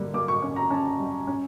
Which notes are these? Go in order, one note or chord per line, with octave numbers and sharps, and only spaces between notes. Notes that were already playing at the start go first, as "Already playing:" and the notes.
Already playing: D3 G3 A#3
A#3 D6
C#6
C#4
A#5
C#4 A5
G3
C#4